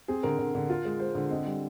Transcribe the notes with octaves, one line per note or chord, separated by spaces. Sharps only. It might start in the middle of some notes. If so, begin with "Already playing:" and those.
C4 G#4
D3 A#4
D3
D3
F4
G#3
G#3 C5
D3
C4 D#5
G3